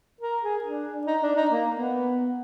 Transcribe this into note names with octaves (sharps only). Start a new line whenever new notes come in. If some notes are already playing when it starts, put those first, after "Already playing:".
A#4
G#4
D4
D#4
D4
D#4
A#3
B3